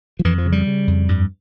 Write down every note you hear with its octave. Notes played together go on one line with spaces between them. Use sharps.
F3
F2 E3
F3
C#3
G3
C#3
F2
G2